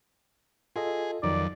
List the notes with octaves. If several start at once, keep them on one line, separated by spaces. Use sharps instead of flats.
F4 G#4 A4 D#5
F2 D#3 F#3 D#4 D5